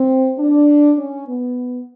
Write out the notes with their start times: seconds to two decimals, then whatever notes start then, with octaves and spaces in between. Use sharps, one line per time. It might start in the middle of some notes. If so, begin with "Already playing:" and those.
Already playing: C4
0.38 D4
0.98 C#4
1.28 B3